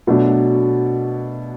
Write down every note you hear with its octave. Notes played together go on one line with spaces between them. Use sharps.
B2 F#3 A3 D4